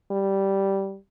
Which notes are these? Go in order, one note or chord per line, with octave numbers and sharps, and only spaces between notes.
G3